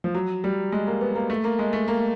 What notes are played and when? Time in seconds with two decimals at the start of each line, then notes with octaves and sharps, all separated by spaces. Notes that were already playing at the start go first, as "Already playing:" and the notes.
0.04 F3
0.15 F#3
0.44 G3
0.72 G#3
0.87 A#3
1.01 B3
1.16 A#3
1.30 A3
1.44 A#3
1.59 G#3
1.73 A3
1.88 A#3